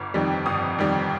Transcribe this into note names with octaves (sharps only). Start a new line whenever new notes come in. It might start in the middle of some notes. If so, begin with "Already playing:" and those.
Already playing: G1 D6
F2 D#3 G3
G1 D#6
F2 D#3 G3